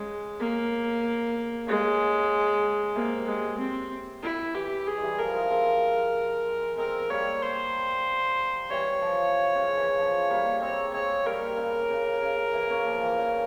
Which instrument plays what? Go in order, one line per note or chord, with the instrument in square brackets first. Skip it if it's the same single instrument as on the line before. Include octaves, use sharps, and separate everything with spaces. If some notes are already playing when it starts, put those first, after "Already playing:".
Already playing: [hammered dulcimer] C#3 [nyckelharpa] G#3
[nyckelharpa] A#3
[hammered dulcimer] C#3 [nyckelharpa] G#3
[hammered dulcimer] C3 [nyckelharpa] A#3
[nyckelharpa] G#3
C4
E4
[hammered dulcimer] E3 [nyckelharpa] G4
[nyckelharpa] G#4
[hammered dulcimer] G#3
E3 G3
[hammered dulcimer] F3 [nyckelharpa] A#4
[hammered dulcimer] F3 G#3
G#3 C4
[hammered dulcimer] G#3 C4 [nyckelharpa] A#4
[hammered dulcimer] G3 A#3 [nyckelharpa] C#5
[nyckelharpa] C5
[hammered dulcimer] E3 G3 [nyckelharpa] C#5
[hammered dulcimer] F3
C#3
E3
F3
G3 A#3
[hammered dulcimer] G#3 C4 [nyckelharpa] C#5
[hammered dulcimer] G#3 C4 [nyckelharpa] C#5
[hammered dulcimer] G3 A#3 [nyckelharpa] A#4
[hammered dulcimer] C#3
C#3
C#3
E3
A#3 C#4
F3
E3
C#3